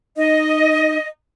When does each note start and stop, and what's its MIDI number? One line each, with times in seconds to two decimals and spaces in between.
0.17 0.98 63
0.17 1.07 75